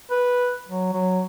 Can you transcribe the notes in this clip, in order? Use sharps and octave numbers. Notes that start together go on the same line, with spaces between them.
B4
F#3
F#3